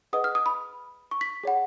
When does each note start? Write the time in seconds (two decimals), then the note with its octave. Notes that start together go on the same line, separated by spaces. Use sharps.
0.13 G#4 B4 D#5 F#5 D#6
0.24 F6
0.35 D#6
0.46 B5
1.11 C#6
1.21 B6
1.44 G#4 C#5 F#5